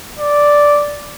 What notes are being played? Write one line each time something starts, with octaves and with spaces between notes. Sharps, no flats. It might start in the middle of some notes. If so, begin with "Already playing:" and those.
D5